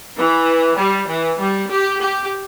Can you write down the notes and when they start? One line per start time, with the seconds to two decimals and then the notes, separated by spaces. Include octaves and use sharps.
0.18 E3
0.79 G3
1.09 E3
1.40 G3
1.70 G4
2.00 G4